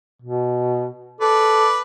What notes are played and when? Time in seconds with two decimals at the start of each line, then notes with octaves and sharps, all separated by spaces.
0.22 B2
1.21 A4 B4 D5